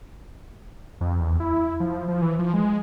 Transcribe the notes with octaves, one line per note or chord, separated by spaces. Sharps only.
F2
E2
E4
F3
F3
E3
F3
G#3